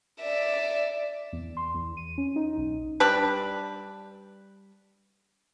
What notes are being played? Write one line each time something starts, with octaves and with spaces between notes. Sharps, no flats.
D5 E5
E2
C6
E2
D#7
C#4
D#4
B1
G3 D4 B4